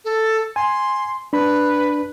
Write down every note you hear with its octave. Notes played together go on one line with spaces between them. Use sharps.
A4
G#5 C6
D4 B4 B5